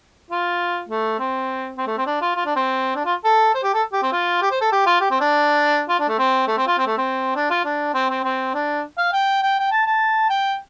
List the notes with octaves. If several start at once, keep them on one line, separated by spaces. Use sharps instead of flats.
F4
A3
C4
C4
A3
C4
D4
F4
F4
D4
C4
D4
F4
A4
C5
G4
A4
G4
C4
F4
G4
C5
A4
G4
F4
G4
C4
D4
F4
D4
A3
C4
A3
C4
F4
C4
A3
C4
D4
F4
D4
C4
C4
C4
D4
F5
G5
G5
G5
A5
A5
G5